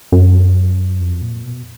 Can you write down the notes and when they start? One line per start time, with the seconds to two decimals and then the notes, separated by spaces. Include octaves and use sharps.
0.12 F#2
1.00 F2
1.22 A#2
1.44 B2